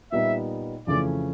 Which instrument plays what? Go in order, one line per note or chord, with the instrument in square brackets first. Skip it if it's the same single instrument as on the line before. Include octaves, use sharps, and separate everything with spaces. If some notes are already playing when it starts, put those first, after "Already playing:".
[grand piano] A#2 G3 B3 D#4 [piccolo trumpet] E5
[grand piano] F2 C#3 E3 A3 C#4 [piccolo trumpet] D5